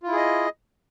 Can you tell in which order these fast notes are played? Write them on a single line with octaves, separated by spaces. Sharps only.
F4 E4 G#4 D#5